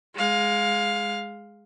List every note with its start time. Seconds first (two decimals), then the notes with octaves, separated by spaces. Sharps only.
0.15 G#3 F5